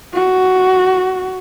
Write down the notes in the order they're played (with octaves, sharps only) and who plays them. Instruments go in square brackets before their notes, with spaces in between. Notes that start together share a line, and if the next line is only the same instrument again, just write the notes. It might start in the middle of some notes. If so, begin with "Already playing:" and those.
[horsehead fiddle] F#4